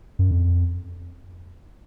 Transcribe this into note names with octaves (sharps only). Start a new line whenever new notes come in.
F#2
F2